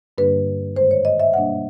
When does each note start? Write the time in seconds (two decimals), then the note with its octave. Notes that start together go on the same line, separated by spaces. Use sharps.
0.18 G2 D3 G3 A#3 D4 B4
0.75 G#2 D#3 G#3 C5
0.91 C#5
1.05 D#5
1.20 E5
1.33 B2 G3 A#3 D4 F#5